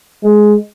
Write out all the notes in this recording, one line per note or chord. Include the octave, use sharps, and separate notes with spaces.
G#3